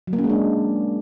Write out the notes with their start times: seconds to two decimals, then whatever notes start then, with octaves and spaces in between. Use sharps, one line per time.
0.07 F#3
0.13 A#3
0.18 C#4
0.24 G#3
0.30 D4